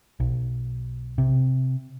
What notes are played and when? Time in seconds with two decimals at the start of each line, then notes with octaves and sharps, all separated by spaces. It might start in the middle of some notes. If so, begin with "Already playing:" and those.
0.20 B1
1.18 C3